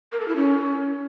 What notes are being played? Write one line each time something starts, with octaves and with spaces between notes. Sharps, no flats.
A#4
A4
E4
C#4